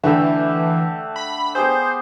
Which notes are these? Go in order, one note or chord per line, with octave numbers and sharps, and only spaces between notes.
D3 E3 A3 G4 E5
B5
B3 G4 G#4 C5